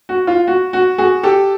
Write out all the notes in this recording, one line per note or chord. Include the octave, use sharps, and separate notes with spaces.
F#4
F4
F#4
F#4
F#4 G#4
G4 A4